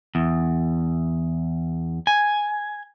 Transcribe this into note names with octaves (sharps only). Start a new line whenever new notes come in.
E2
G#5